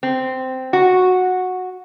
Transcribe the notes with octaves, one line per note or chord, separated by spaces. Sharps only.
C4
F#4